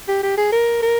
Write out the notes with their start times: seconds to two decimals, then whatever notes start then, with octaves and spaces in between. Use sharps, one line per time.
0.08 G4
0.23 G4
0.38 G#4
0.52 A#4
0.82 A#4